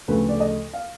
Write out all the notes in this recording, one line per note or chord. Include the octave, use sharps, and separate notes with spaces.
D2 C#3 F3 A3 B4
D5
D#5
F5